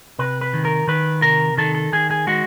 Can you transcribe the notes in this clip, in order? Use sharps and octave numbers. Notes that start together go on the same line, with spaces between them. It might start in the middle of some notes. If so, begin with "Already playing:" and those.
C3 B4
B4
D#3
A#4
D#3 B4
C3 A#4
D#3 A4
A4
D#3 G#4
G#4
G#3 F#4